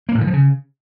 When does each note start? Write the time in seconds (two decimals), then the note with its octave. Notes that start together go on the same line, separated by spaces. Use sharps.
0.09 A#3
0.15 A2
0.21 D#3
0.27 F3
0.33 C#3